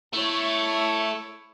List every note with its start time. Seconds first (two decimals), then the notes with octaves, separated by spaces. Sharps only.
0.13 A3 E4 C#5